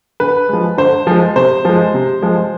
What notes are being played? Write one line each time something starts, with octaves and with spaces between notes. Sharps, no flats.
D3 B4
F3 G#3
D3 C5
F3 G#3
C3 C5
F3 G#3
C3
F3 G#3